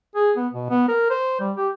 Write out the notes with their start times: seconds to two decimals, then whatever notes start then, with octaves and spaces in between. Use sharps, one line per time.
0.16 G#4
0.37 B3
0.53 B2
0.70 B3
0.88 A#4
1.10 C5
1.40 G3
1.57 G4